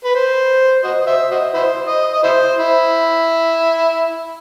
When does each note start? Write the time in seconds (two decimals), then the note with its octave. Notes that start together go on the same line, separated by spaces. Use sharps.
0.04 B4
0.15 C5
0.84 F#4 C5 D#5
1.07 C5 E5
1.31 F#4 C5 D#5
1.54 E4 C5
1.87 D#5
2.13 D#5
2.23 E4 C5
2.58 E4